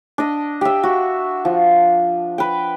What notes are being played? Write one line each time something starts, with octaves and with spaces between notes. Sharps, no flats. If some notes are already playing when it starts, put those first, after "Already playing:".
D4 D#5
G4 E5
F#4
F3
B4 G5